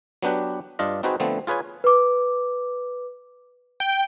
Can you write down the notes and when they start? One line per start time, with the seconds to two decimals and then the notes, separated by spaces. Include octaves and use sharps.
0.23 F#3 B3 D4 G4 B4
0.79 G2 D4 F4 D#5
1.03 C4 D#4 F#4 G#4 B4 C5
1.20 D3 F3 A3 B3 C4
1.47 F4 G#4 B4 C#5 G#5
1.84 B4 D6
3.80 G5